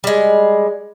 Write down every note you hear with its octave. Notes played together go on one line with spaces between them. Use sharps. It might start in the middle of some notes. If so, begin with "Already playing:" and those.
G3 G#3